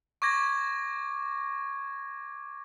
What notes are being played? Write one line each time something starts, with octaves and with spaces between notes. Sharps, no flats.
C#6 D6 G#6 A#6